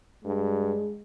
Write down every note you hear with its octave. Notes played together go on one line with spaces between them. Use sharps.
G2 G#3